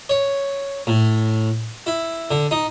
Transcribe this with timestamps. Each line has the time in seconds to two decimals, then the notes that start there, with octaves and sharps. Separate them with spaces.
0.09 C#5
0.87 A2
1.86 E4
2.31 D3
2.51 D#4